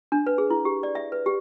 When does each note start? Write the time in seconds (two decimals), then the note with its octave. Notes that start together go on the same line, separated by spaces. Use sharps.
0.12 D4
0.26 B4
0.38 G#4
0.50 E4
0.65 G4
0.83 D5
0.95 E5
1.12 B4
1.26 G4